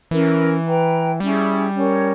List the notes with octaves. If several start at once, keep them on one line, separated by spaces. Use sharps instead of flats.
E3 C#4 E4 A#4
B4 G5 A#5
G3 C#4 E4 G#4
C#4 G4 A#4 C#5